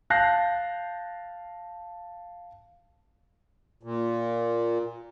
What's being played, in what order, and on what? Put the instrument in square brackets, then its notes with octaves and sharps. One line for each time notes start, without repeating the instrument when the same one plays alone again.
[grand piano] F5 A5 F#6 G6 A#6 C7
[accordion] A#2